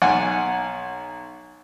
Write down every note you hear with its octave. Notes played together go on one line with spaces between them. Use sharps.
B1 F#5 G#5